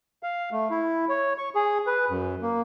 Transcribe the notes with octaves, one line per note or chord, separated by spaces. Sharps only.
F5
A3
E4
C#5
C#6
G#4
B4
F#2
A#3